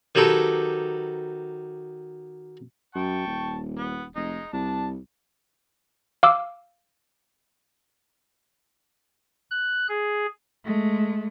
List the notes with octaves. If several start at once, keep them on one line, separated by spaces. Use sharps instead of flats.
D#3 F#3 G4 A4 B4
F#2 G5 A5 C#6
D#1
B3
F1 G#3 D#4
C2 D4 A5
F5 D6 E6
F#6
G#4
G#3 A3